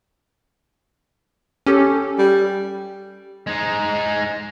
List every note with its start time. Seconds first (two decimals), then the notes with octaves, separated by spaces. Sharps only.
1.66 C#4 G4 A4
2.19 G3
3.47 G#3 D#4